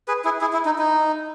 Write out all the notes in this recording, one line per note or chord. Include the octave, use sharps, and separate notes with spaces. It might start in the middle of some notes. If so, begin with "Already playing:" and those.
G#4 B4
E4 G#4
E4 G#4
E4
D#4
D#4